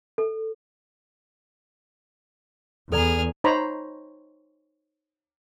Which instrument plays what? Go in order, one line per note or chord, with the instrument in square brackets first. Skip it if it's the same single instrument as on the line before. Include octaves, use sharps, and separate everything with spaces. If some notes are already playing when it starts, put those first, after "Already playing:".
[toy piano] A4
[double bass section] E2 [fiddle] G#4 F6 [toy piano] A4 D5 A#5
[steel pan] D#4 C5 C#5 A#5 B5